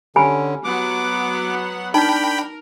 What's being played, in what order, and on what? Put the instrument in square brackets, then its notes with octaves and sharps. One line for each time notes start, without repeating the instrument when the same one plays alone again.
[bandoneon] D3 C#4 [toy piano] G4 G#5 B5
[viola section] F#3 B3 F#5 [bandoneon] D6
[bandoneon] D4 [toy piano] D#4 [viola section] A#4 [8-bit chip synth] G5 B5